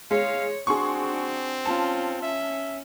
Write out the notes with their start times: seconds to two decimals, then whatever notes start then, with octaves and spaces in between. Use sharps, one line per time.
0.11 G#3 C#5 F5
0.67 C4 D4 F#4 G#4 C6 C#6
1.65 C#4 F4 A5
2.23 C#4 E5